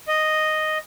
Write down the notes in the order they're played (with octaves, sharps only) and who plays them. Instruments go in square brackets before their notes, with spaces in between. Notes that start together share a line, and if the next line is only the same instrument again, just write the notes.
[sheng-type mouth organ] D#5